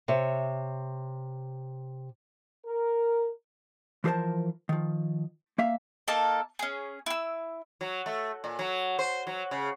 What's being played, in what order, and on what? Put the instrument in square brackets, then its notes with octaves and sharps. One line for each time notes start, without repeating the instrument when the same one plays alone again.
[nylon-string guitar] C3 C#5 E5
[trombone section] A#4
[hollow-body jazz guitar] E3 F3 G#4 A#4 C5 A5
D#3 F3
A#3 E5 F5
[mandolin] A#3 D#4 A4 A5
C#4 G#4
E4 E6
[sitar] F#3
A3
A#2
F#3
C5
F#3
C#3